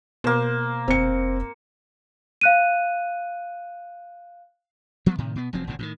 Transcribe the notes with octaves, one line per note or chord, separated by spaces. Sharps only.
B2 A#3 C5
F1 C4 C#7
F5 F#6 D#7
F3 G3 B3
A2 C3 D#3
B2 B3
F1 F3 F#3 C4
G#1 G2 A#2 C#3
A2 D3 D#3